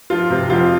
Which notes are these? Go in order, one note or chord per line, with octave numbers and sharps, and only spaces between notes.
F3 F4
C3
F2 F4